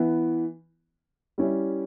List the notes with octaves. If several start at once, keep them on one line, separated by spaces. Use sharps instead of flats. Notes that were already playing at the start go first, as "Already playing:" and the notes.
Already playing: E3 B3 E4
G3 C#4 E4 G4